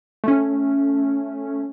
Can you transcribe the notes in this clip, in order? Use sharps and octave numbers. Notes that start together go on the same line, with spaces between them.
A3 C#4